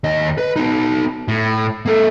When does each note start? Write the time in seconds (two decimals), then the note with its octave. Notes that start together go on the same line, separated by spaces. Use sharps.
0.04 D#2 D#5
0.38 B4
0.56 B3 D#4
1.28 A2
1.86 A#3 A4